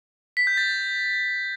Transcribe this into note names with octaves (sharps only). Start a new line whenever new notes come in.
B6
G6
A6